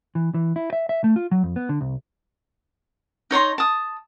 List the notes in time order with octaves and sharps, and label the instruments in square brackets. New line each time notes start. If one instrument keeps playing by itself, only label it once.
[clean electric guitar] E3
E3
E4
E5
E5
A3
F4
F#3
F2
B3
D3
C2
[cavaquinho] D#4 C#5 A#5 C6
A5 D#6